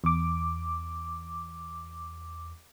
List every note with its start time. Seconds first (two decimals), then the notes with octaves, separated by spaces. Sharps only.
0.04 E2 D6